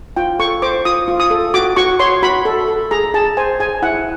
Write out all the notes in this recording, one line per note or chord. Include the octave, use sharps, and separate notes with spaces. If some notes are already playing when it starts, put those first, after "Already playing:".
F4 G5
A4 C#6
C5 D6
F4 D#6
F4
D#6
A4
F#4 D6
F#4 C#6
C#5 C6
F#4 B5
A4
A4
G#4 A#5
G#4 A5
C5 G#5
G#4 G#5
E4 F#5